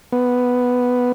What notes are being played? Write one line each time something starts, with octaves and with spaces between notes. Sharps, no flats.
B3